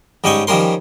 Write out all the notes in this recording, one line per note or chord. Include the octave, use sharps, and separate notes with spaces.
G#2 G3 C#4 D#5 G5 C#6
D#3 F3 G3 C#4 A#4 C6